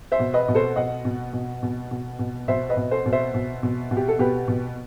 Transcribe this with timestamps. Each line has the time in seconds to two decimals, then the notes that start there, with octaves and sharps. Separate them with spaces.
0.12 C5 E5
0.20 B2
0.34 B4 D#5
0.48 B2
0.55 A4 C5
0.76 B2 D#5 F#5
1.05 B2
1.33 B2
1.63 B2
1.91 B2
2.19 B2
2.48 B2 C5 E5
2.69 B4 D#5
2.77 B2
2.91 A4 C5
3.06 B2
3.13 C5 E5
3.34 B2
3.63 B2
3.91 B2
3.97 G4
4.08 A4
4.19 B2 G4 B4
4.48 B2